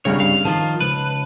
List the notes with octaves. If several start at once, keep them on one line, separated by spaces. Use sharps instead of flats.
C2 G2 C#3 C#5
F5
D#3 F3 F4 A5
C#2 B4